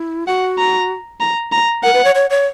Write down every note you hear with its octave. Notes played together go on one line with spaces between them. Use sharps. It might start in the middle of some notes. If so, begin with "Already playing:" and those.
Already playing: E4
F#4 F#5
A#5
A#5
A#5
A#4 F#5
B4
C#5
C#5
C#5